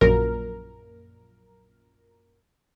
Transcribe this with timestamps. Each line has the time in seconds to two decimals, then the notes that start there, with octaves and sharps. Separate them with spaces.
0.01 A#1 F#2 A#2 A#4